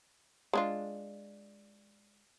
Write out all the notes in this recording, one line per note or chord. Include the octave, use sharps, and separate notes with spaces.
G#3 D4 F4